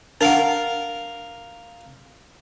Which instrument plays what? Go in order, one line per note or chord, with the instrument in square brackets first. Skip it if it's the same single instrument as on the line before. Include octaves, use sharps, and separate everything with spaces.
[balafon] D4 F#5 [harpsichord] A#4 F5